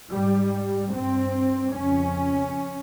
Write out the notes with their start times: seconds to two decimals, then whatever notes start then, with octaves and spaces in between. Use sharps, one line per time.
0.12 G#2 G3
0.93 G2 C4
1.74 F2 C#3 C#4